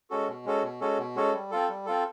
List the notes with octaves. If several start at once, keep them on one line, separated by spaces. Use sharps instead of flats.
G#3 C#4 F#4 A4
B2
G#3 C#4 F#4 A4
B2
G#3 C#4 F#4 A4
B2
G#3 C#4 F#4 A4
G3
C4 F4 A4
G3
C4 F4 A4